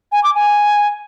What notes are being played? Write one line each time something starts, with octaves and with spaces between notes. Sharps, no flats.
G#5
D6
G#5